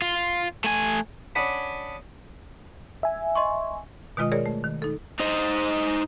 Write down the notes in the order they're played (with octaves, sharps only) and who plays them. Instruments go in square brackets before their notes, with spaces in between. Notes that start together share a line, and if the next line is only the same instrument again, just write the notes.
[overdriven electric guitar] F4
A3 G#5
[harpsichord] C#4 D4 D#5 F#5 B5
[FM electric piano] E5 G#5
[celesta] D#5 C6 C#6
[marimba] B2 D#3 G#3 F4 D#5 D#6
G#4 A#4 C#5 D5
A3
D#3
D#4 A4
[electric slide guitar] D#4 C5 D#5